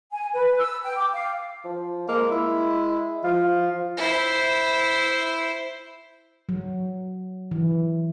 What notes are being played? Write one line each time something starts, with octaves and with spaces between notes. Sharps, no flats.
G#5
B4
E6
G5
D6
F5
F3
G#3 A#3
E4
F3 F4
E4 C5
F#3
E3